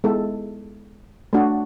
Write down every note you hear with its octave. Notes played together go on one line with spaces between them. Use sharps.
G#3 B3 E4 A4
A3 D4 F#4